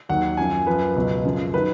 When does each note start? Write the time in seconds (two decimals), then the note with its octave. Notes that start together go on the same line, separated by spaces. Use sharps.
0.09 D#2 D#3 F#3 F#5
0.37 F#2 F3 G#5
0.66 F#2 F3 B4
0.96 C#2 B2 F#3
1.24 F#2 C#3 F3
1.53 D#3 F#3 B4